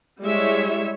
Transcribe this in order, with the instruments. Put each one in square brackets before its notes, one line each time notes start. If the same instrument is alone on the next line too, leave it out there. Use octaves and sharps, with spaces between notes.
[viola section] G3 G#3 E4 C#5 E5